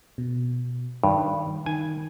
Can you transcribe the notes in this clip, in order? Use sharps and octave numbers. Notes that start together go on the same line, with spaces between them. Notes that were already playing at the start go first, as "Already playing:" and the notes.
B2
G2 D#3
D#3 G#5